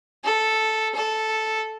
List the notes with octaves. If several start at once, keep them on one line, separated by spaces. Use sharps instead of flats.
A4
A4